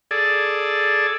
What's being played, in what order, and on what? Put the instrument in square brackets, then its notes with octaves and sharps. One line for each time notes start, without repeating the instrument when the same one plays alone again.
[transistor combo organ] G#4 A4 D5